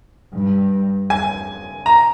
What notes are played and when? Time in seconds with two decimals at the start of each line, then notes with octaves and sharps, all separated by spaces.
0.33 G2
1.10 G#5
1.86 A#5